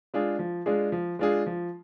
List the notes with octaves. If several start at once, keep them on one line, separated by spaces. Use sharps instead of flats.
G#3 D4 F4 G#4
F3
G#3 D4 F4 G#4
F3
G#3 D4 F4 G#4
F3